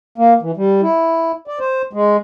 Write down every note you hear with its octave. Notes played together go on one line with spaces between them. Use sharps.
A#3
E3
G3
E4
D5
C5
G#3